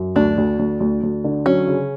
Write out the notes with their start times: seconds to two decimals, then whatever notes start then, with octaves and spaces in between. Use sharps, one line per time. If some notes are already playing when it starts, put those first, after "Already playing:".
Already playing: F#2
0.16 D2 D4
0.38 D2
0.59 D2
0.80 D2
1.03 D2
1.24 D3
1.46 F#3 C#4
1.68 C#3